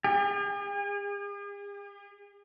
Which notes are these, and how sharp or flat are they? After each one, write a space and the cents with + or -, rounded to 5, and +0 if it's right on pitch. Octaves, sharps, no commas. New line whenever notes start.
G#4 -45